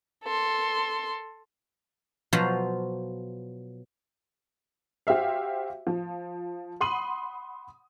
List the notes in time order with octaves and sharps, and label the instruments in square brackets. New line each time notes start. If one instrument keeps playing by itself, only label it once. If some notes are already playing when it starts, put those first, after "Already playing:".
[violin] A4 C6
[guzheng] B2 F3 F#3 F4 C5 A#5
[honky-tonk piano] F#4 G4 C5 E5 F5
F3
F#5 B5 C6 D#6 D#7 F#7